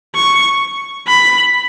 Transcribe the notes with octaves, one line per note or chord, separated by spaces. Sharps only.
C#6
B5